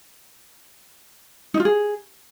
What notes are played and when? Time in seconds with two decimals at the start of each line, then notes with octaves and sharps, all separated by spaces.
1.54 D#4
1.60 F4
1.65 G#4